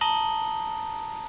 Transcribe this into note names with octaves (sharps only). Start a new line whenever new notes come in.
A5 A#5 D#6 A#6 F#7 G7